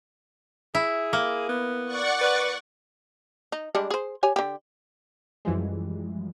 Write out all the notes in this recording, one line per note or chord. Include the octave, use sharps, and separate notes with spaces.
E4 G#4
A#3
B3
D5 F#5 C#6
B4
D#4
G3 G#3 D4
G#4 C5
G4 C#5 G#5
D3 G4
F#2 E3 F3 G3 G#3